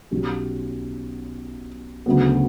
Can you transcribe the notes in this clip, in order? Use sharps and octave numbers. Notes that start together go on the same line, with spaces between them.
B1 B2 F#3 C#4 G4
D2 C#3 F#3 B3